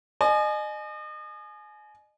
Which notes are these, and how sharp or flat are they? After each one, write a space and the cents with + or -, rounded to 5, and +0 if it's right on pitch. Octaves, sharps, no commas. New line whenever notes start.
D#5 -35 G#5 +30